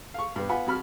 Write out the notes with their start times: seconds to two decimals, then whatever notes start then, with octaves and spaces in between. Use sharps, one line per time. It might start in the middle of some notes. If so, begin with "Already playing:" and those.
0.14 F5 C#6
0.36 G2 B3
0.49 B3 F4 F#5 G#5 B5
0.67 F2 F#4 B5 F6